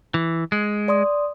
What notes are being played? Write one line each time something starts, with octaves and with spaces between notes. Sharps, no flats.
E3
G#3
D5 C6 D#6